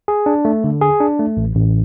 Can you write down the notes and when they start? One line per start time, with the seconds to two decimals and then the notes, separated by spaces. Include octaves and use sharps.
0.08 G#4
0.26 D4
0.45 A3
0.64 D3
0.81 G#4
1.00 D4
1.19 A3
1.37 A1
1.56 A1